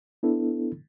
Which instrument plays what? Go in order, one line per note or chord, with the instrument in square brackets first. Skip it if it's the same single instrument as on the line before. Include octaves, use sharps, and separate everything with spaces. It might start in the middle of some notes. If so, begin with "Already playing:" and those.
[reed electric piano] B3 D4 E4 A4